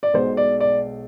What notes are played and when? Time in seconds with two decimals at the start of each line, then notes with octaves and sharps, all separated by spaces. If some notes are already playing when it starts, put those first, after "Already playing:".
0.03 D5
0.13 B1 B2 G#3 C5
0.37 D5
0.60 D5